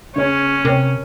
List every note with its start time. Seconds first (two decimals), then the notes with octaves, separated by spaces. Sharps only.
0.16 C#3 C#4 C#5
0.65 C3 A#4 C#5